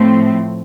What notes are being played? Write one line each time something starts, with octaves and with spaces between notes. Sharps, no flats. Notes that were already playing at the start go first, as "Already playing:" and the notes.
Already playing: A2 F3 A3 C4